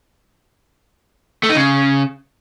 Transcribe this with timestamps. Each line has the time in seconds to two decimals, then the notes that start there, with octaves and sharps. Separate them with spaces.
1.43 A3
1.49 D#4
1.56 C#3